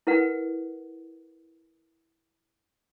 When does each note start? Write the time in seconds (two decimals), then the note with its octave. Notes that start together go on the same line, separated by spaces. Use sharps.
0.07 E4 A#4 B4 F#5